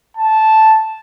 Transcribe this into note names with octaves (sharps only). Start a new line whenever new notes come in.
A5